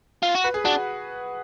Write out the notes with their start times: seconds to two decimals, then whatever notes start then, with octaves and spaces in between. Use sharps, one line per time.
0.23 F4
0.35 F#4
0.44 B4
0.54 G#4
0.65 D4 F#4